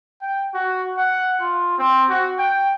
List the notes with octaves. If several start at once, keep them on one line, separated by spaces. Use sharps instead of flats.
G5
F#4
F#5
F4
C4
F#4
G5